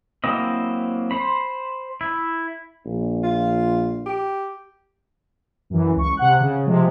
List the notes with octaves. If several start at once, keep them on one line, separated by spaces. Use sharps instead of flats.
F#3 A#3 C4 E4 D#5
C5 B5
E4
A#1
F4
G4
F#2 E3
C#2 C#6
C3 F#5 F#6
C#3
C3 F3 G#3